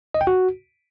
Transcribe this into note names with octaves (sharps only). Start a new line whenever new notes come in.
D#5
G5
F#4